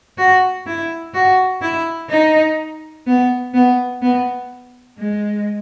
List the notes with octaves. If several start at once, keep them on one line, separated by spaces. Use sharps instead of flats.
F#4
E4
F#4
E4
D#4
B3
B3
B3
G#3